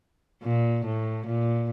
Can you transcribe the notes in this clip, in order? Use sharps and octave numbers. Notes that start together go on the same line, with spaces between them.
A#2
A2
A#2